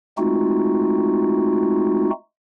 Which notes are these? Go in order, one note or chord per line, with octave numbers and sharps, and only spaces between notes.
G#3 A3 C4 D#4 F4 F#4